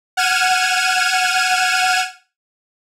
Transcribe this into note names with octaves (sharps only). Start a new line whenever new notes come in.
F#5 F6 G#6 D#7 E7